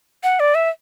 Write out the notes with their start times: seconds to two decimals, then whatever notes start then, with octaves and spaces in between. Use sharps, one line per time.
0.24 F#5
0.40 D5
0.55 E5